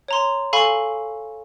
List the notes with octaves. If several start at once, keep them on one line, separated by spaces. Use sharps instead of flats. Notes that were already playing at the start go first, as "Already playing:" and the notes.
C#5 A#5 C6
A4 F5 G#5 B5 C#6